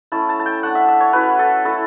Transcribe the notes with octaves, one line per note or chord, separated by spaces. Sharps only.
A3 C#4 E4 A5
A5
A5
G5
A3 D4 F#5
E5
E5
C#5
F#3 C#4 E4 B4
A4
A3 E4 A4